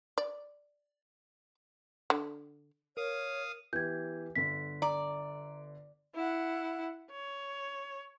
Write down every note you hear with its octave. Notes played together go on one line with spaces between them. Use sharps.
D5
D3
A#4 C#5 F5 D#6
E3 B3 G4 G6 G#6
G1 D3 B6
D5 A#5
E4 F#5
C#5